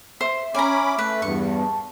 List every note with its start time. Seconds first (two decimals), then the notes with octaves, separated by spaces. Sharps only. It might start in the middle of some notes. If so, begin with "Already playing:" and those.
0.21 C5 E5
0.55 C#4 G#5 A#5 B5 D6
0.99 A3 B4
1.22 E2 G2 C#6
1.57 A5